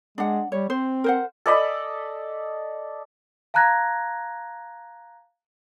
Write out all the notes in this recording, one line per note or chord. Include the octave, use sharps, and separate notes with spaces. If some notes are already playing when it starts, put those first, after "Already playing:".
G#3 D4 F#5
G3 C#5
C4 C5
A#4 C5 F#5
A4 D5 D#5 B5
F5 A5 A#5 F#6 G#6 A#6